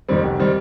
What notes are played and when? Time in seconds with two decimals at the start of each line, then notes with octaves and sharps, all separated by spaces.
0.09 F2 D#3 G3 C4
0.24 F1
0.40 D#3 G3 C4